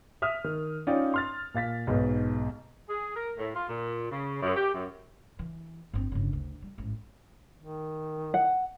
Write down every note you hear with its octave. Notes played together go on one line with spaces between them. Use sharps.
E5 D#6 F6
D#3
C#4 D#4 F4 D5 G5
C6 F6 A6
A#2 F5 A6 B6
B1 G#2 B3
G#4
A#4
A2
F4
A#2
C#3
F#2
G4
F#2
E3
G1 C4
G1 C#3
D2
G3
A1 G#2
D#3
F#5